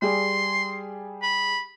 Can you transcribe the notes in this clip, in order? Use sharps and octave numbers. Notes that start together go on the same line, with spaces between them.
G3 G4 G#4 C6
B5